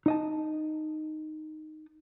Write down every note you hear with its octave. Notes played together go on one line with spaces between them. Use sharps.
D#4 D#5 A5